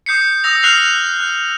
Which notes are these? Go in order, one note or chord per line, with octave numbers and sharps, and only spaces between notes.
D#6 G6 C7 C#7
D#6 E6 A#6 F7
D#6 F6 F#6 C7 F7 F#7
F#6